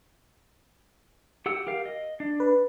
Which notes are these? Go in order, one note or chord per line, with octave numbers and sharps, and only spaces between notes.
G4 F#5 E6
G4 A#4 F5
D#5
D4
B4